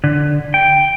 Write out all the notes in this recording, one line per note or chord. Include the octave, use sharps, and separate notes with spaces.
D3
G5